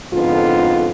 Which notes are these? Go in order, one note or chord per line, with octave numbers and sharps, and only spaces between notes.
F2 G#2 D3 B3 F4